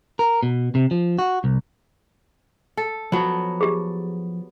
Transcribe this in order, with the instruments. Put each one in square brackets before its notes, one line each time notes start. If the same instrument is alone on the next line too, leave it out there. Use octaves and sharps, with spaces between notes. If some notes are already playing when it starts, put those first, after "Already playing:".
[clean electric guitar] A#4
B2
C3
F3
F#4
C2
[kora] A4
[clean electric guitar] F3 F#4 A5 [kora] F#3 B3
[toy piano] G4 G#4